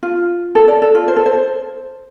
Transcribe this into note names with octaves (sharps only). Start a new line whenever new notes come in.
F4
A4
D5
A4
F4
C5
A4
C5